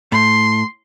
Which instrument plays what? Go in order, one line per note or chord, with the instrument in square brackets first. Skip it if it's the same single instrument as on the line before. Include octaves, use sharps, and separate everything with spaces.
[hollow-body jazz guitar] A2 [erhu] C6